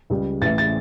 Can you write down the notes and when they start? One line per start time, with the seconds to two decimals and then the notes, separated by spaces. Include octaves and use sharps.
0.10 C#2 C#3 G3
0.41 A1 A2 E3 A6
0.58 A6